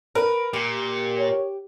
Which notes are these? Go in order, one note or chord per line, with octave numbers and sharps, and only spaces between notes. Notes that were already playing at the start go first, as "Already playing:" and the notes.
A#4 B4
A#2 G4
C#5